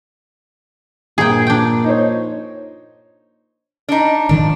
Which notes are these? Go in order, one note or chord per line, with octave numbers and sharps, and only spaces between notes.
A#1 G2 A#2 G#4 G5
D4 G5
D#4 C5 C#5
D4 D#4
G#1 D#3 F3 D4